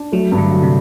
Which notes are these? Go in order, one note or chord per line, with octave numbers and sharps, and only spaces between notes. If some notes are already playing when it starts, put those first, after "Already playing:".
Already playing: D4
F#3 A3
G2
D3
F#3
C3